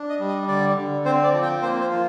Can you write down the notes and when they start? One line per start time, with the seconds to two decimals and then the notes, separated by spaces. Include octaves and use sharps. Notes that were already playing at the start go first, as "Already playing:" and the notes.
Already playing: D4
0.09 D#5
0.19 G3
0.28 D#5
0.48 D3 D5
0.77 D3
1.05 C4 C5
1.24 D5
1.33 F3
1.43 G5
1.62 A#3 C5
1.81 C5
1.91 F4